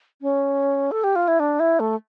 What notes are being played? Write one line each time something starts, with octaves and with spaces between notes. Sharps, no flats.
C#4
A4
G4
F4
E4
D4
E4
A3